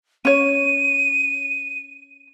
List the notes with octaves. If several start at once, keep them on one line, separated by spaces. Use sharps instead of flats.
C#4 C#5 D#7